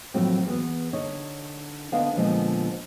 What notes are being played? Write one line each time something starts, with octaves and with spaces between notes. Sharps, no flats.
A2 D#3 F3 F#3 A3 C4
E2 B3
D3 D#4 C#5
D2 B3 D4 D#4 F5
A#2 D3 F3 G#3 B3